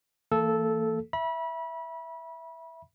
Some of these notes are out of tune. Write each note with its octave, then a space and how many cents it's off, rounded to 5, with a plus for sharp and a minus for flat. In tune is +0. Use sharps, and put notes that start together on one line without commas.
E3 +0 A#3 -40 A4 -10
E5 +0 B5 -30